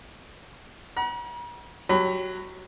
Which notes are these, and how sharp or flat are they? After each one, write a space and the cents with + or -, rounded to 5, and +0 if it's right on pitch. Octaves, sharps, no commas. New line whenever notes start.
F#5 +25 A#5 +45
F#3 +0 G4 -5 B5 +25